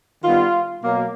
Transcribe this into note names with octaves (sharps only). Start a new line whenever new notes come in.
D#3 G3 B3 F4
B2 F#3 A#3